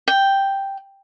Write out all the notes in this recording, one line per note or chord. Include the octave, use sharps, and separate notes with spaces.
G5